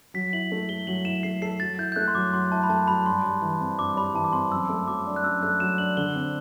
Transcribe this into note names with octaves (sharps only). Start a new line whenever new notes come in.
F#3 B6
E4 F#7
A3
A4 G7
F#3 F#7
E4 E7
A3 C7
A4 C7
F#3 A6
E4 G6
G6
A3 F#6
C6
F#3 D6
F#3 C6
E4 A5
B5
A3 A5
F#3 B5
G2 C6
G3
E3
C4
G2 D6
G3 B5
E3 A5
D6
C4 C6
F#2 E6
A3
F#3 D6
D4
F#6
F#2 E6
A3 F#6
F#3 E7
D4 F#7
D3 G7
C4